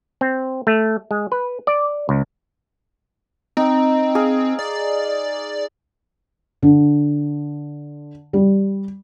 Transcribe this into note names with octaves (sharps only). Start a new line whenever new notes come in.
C4
A3
G#3
B4
D5
C#2
C4 D#4 G5
G#4 F5
D5
D3
G3